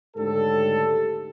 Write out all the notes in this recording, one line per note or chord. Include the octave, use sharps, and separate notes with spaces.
D2 G#2 C#3 G3 G4 A4